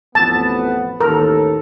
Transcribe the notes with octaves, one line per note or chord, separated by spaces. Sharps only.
A1 F2 B3 A5
A1 D#2 A4 A#4